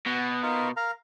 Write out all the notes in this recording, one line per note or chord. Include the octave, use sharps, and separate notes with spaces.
B2 F#5
D#4 F4 A#4
A#4 F5 A#5